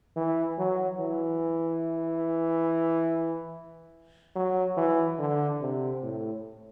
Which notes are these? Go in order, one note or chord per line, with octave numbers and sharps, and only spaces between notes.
E3
F#3
E3
F#3
E3
D3
C3
A2